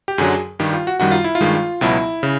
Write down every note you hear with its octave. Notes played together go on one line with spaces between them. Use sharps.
G4
F#2 D3 F#3 G#4
G2 D#3 G3 G4
F4
F#4
F#2 D#3 G3 F#4
F4
E4
F4
G2 D#3 G#3
C#2 B2 F#3 E4
C#3